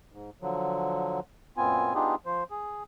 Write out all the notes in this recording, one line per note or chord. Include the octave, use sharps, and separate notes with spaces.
G#2
D3 F3 F#3
F#2 A#2 B3 C4 F4 G#5
B3 D4 D#4 F4 G4 G#4
F3 C5
G#4